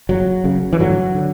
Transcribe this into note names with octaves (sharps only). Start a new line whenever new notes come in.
F#1 F#2 C#3 F#3
F#1 F#2 C#3
E3
A1 G2 D3 F#3
D3